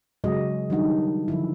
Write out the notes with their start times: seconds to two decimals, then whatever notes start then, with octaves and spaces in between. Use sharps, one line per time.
0.24 C#3 F#3 G#3 F#4 G#4 D#5
0.70 D#3 F#3 G3 D4 D#4 F#5
1.28 D3 F3 E4